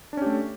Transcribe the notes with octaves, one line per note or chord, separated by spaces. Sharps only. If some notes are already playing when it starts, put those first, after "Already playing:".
A3 C#4 D4 G4